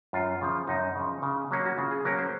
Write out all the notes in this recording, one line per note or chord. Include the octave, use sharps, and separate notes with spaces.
F#2 F4
C#3 F3
F#2 D#4
C#3
F3
C#3
F#3 A#3 C#4
F#4
C#3 F4
G#4
F#3 A#3 C#4 A#4
C5